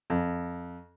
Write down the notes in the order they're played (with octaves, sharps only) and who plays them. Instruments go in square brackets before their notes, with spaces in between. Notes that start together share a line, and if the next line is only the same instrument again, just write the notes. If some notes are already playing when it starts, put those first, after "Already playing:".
[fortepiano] F2